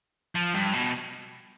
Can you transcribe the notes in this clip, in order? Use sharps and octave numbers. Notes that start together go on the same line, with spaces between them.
F3
G2
B2